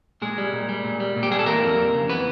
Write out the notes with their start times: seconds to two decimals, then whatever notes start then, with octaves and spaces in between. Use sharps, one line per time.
0.22 A#2 G#3 G#4
0.38 G3
0.53 A#2
0.69 G3
0.84 A#2
1.00 G3
1.16 A#2
1.23 G4
1.31 G3 G#4
1.39 A4
1.46 E3 A#3 A#4
1.63 F2
1.79 F2
1.94 C#3
2.09 E3 B3 B4